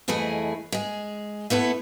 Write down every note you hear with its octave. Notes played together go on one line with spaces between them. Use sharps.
F2 E3 A3 E4 G#4 D#5
G#3 G#4
A3 B3 E4 A4